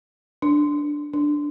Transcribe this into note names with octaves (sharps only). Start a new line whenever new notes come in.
D4
D4